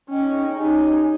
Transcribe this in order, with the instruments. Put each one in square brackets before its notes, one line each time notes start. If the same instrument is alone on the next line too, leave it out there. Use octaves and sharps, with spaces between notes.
[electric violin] C#4 [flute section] D#4 G#4 D#5 G5
[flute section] C#4 G4 C#5 G#5 [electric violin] D#4